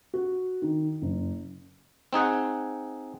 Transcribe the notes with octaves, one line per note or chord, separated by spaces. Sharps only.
F#4
D#3
F#1
C4 D#4 G#4 F#5